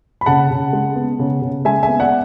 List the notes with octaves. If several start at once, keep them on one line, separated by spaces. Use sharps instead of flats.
B5
C#3 F#5 A5
C#3
G#3
B3
C#3
C#3
G#3 E5 G#5
B3 E5 G#5
D5 F#5